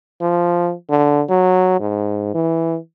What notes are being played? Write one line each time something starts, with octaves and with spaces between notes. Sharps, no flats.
F3
D3
F#3
G#2
E3